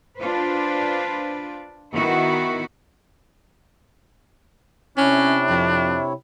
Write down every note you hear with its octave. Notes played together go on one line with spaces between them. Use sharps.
D4 F4 B4 C5
D#3 B3 E4 F#4
C3 C#4 D4 E4 C#5
F2